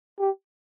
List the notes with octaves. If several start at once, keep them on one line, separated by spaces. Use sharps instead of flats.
G4